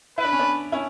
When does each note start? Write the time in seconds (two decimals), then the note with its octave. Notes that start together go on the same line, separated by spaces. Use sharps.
0.18 E4 B4
0.25 D4
0.33 C#4
0.39 B3 D4
0.72 C#4 E4